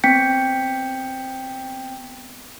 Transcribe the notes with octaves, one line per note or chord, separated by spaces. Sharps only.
B3 C4 G5 G6 B6 C#7